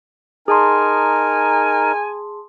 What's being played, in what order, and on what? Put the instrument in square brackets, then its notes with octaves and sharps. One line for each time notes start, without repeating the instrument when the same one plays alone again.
[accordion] D#4 A#4 [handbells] G#4 A5 C6 [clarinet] G#5